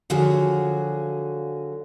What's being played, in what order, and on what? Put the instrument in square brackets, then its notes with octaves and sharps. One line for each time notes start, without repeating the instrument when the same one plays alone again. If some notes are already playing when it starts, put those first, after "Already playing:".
[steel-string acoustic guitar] D3 F3 F#3 F#4 G#4